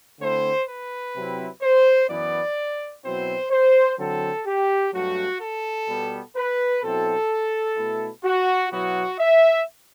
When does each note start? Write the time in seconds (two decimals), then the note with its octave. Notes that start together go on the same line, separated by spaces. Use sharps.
0.20 D3 A3 C4 E4 C5
0.67 B4
1.15 C3 F#3 C4 E4
1.62 C5
2.10 F#2 E3 B3 E4 D5
3.04 B2 F#3 C4 E4 C5
3.51 C5
3.99 D3 F#3 C4 E4 A4
4.47 G4
4.93 G2 F#3 A3 F#4
5.41 A4
5.88 B2 G3 B3
6.36 B4
6.83 B2 F#3 C4 E4 A4
7.77 B2 A3 E4
8.25 F#4
8.72 B2 F#3 B3 E4 F#4
9.20 E5